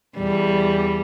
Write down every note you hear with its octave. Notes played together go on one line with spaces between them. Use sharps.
E2 G3